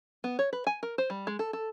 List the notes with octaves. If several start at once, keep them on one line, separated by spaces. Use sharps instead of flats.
B3
C#5
B4
G#5
A#4
C5
G3
G#3
A4
A4